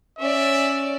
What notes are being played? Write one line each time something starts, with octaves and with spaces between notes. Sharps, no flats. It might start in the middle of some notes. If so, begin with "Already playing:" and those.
C#4 D5 E5